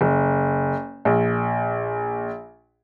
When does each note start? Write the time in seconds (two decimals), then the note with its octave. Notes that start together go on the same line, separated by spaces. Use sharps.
0.01 F#1
1.05 A#1